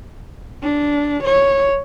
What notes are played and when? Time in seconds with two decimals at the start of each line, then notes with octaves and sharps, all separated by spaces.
0.63 D4
1.24 C#5